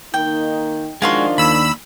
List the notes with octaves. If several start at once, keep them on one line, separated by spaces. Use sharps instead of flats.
D#3 A#3 D#4 G5
D#3 F3 G#3 D4 F4 F#4 F5 C6
D#2 B5 E6